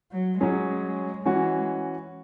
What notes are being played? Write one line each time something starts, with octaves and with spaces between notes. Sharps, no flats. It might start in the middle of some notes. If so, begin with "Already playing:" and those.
F#3
F#3 G#3 C#4 G#4
E3 G#3 C#4 F#4